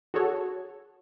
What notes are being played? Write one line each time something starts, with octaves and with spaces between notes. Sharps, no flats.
F#4 G#4 A4 C#5